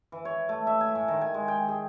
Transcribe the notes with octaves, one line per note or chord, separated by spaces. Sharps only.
E3
C#5
A3
E5
G#5
A2
D#3
G#5
G#3
G5
G#4